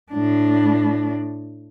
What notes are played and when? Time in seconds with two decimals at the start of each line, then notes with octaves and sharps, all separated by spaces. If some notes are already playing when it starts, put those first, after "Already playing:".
0.12 A2 D4